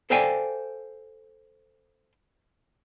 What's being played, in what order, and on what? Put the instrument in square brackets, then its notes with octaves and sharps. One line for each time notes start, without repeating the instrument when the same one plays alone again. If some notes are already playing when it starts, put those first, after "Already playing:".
[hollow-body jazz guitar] A4 C5 D5 F5 G5 G#5